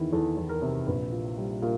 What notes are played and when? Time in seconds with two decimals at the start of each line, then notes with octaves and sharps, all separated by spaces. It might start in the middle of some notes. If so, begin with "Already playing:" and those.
Already playing: E2 D#3 E4
0.12 E2 A4
0.37 E2
0.49 A#4
0.62 C3
0.87 A#1 B4
1.12 A#2
1.38 G3
1.62 A#2 A#4